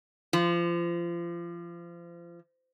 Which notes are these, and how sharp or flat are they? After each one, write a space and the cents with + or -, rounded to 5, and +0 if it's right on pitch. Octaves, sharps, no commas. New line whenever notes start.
F3 -30